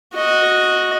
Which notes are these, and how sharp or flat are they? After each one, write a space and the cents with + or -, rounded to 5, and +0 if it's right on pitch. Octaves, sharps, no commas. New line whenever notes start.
F#4 -10 D#5 +0